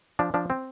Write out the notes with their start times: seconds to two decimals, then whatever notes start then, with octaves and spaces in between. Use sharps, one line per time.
0.19 F3 D4
0.34 F3 D4
0.50 C4